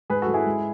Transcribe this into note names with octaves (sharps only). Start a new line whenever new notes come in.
G#2 G#4 B4
F#4 A4
G#2
E4 G#4
G#3